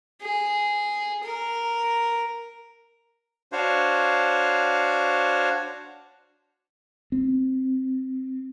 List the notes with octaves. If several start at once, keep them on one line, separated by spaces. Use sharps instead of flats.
G#4
A#4
D4 F#4 C5 C#5 F5
C4